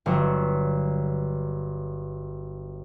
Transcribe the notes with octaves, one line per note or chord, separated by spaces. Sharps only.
G1 F#3